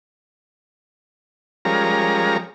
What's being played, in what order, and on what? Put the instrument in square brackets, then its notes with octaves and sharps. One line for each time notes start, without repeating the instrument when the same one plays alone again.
[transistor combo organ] F3 G3 G#3 C#4 A#4 A#5